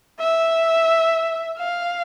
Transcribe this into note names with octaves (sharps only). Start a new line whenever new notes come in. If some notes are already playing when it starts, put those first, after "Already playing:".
E5
F5